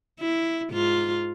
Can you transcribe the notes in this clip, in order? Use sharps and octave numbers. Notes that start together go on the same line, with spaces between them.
E4
G#2 F4